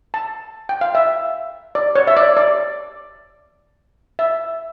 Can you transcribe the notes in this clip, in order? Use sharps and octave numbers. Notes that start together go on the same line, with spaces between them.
A5
G5
F5
E5
D5
C#5
E5
D5
D5
E5